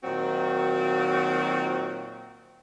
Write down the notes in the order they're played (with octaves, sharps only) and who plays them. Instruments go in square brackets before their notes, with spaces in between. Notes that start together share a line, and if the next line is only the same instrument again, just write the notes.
[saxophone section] A#2 D#3 F#3 C4 F#4